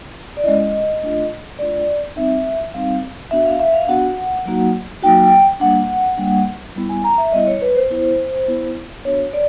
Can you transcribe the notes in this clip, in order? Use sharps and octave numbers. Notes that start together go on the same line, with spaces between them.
D5
G#3 C#4 E4 D#5
A3 D4 F4
A3 D4 F4 D5
G3 C4 D#4 E5
G3 C4 D#4 F5
B3 D4 F#4 E5
F5
E5
F5
B3 D4 F#4 F#5
F#3 A#3 D#4 F#4
F#3 A#3 D#4 F#4 G5
G3 A#3 D4 F#5
G3 A#3 D4
G3 B3 E4
G#5
A#5
E5
G3 B3 E4 D#5
C#5
B4
C5
B3 E4
B3 E4
B3 D4 F#4 C#5
C#5
D5